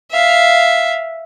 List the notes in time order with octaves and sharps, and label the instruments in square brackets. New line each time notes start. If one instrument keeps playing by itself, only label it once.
[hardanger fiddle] E5 F5